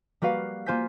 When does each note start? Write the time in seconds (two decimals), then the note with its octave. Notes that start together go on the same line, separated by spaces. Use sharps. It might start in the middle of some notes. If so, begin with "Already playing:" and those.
0.22 G3 A#3 F#4 B4 F5
0.66 A#3 F4 C5 G#5 G6 B6